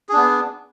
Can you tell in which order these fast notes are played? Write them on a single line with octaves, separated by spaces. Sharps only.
G#4 D4 B3